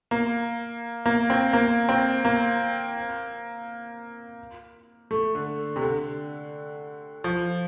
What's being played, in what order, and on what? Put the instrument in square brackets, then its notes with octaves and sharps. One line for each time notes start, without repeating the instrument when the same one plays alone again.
[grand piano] A#3
A#3
C4
A#3
C4
A#3
A3
D3
C3
D3
F3